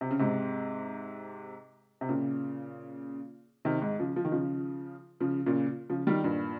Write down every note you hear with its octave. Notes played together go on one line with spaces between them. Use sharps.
C3
C#3
G#2 C3
C3
A#2 C#3
C3 D#3
G#2
C#3 F3
F3
D#3
C#3 F3
C#3 F3
A#2 C#3
C#3 F3
D#3 G3
G2 A#2